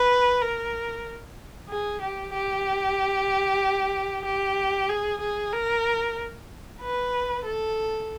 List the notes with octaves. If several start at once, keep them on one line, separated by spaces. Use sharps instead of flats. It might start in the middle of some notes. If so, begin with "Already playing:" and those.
Already playing: B4
A#4
G#4
G4
G4
G4
G#4
G#4
A#4
B4
A4